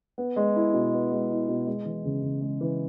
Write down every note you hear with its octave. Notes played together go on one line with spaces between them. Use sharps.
B3
G#3
E4
B2
B3
G#3
E4
B2
G#3
E3
C#3
C#3
G#3
E3